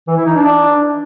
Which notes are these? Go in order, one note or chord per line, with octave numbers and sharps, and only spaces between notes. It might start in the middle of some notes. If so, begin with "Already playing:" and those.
E3
E4
D#4
D4